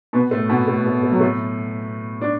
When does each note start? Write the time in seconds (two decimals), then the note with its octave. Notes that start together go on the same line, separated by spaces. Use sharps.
0.13 B2 B3
0.31 A2 A3
0.49 B2 B3
0.67 A2 A3
0.86 A2 A3
1.03 A3
1.12 F#3
1.20 A2 A3
2.21 D4